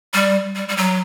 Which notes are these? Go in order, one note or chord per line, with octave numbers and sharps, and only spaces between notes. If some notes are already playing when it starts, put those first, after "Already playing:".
G3
G3
G3
F#3